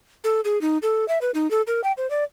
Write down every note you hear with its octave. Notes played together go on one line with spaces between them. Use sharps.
A4
G#4
D#4
A4
E5
B4
D#4
A4
A#4
G5
C5
D5